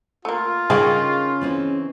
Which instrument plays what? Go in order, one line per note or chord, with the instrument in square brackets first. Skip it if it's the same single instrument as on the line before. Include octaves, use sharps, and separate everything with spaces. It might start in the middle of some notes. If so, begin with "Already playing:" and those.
[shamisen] A3 A#3 [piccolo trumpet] F4
[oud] C#3 [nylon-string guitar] D#4 A#4 D#5 [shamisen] G#4 F5 G5
[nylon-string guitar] E3 C4 D#4